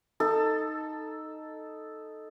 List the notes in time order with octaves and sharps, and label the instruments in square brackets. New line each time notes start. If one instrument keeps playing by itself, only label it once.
[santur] D#4 A4